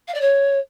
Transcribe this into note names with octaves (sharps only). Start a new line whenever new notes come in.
F5
D5
C#5